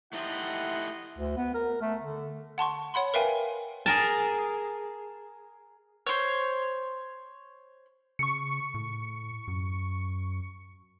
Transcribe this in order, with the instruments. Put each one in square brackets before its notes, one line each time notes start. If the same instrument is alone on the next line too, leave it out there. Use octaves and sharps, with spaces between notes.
[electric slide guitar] A3 D#4 G4 [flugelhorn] E4 [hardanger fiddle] D#5 C6 [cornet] F#5
[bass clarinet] D2
B3
A#4
A3
D3
[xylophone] F#5 A5 C6 C#6
C#5 F#5 B5 C6
A#4 B4 E5 F5 G5 G#5
[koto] G#4 A#4 A5
[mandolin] C5 C#5
[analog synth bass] C#3 [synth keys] C#6 C#7
[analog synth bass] A2
F#2